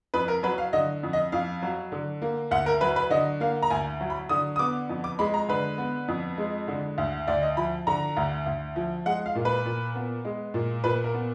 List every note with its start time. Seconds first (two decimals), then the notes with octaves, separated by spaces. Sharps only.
0.14 F2 B4
0.28 A#4
0.43 F#3 B4
0.58 F5
0.73 D3 D#5
1.03 F2
1.13 D#5
1.32 F2 F5
1.62 F#3
1.92 D3
2.22 A#3
2.51 D2 F#5
2.66 A#4
2.81 F#3 B4
2.96 B4
3.10 D3 D#5
3.40 A#3 F5
3.62 A#5
3.70 D2 G#5
4.01 F#3
4.10 B5
4.29 D3 D#6
4.56 D#6
4.59 B3 D6
4.89 F2
5.04 D6
5.19 G#3 B5
5.34 A#5
5.49 D3 B4
5.78 B3
6.08 F2
6.37 G#3
6.68 D3
6.98 D2
7.27 D2 D5
7.42 D#5
7.57 F3 B5
7.87 D3 A#5
8.17 D2
8.46 D2
8.76 F3
9.06 G#3 F#5
9.26 F5
9.35 A#2
9.45 B4
9.65 A#2
9.95 B3
10.25 G#3
10.54 A#2
10.84 A#2 B4
11.04 A#4
11.14 B3